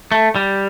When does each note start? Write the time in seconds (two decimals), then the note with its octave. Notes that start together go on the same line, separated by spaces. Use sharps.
0.12 A3
0.36 G3